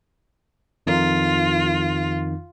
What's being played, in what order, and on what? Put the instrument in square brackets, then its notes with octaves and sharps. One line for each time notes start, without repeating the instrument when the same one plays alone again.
[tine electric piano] F2 D#3 D#4 [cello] F4